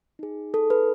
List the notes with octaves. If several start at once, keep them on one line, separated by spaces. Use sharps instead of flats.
D#4 G#4
A4
B4